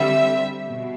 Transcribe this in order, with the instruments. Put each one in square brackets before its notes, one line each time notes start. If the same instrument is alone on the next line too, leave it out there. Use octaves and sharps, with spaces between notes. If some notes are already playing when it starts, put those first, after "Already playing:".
Already playing: [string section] D3 G3 C4 E5
B2